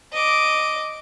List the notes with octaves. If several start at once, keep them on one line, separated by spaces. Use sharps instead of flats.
D#5 D6